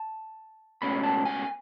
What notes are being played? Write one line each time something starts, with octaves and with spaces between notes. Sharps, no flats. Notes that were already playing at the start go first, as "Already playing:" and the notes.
Already playing: A5
C#2 B2 A3 C#4 B5
A5
G#5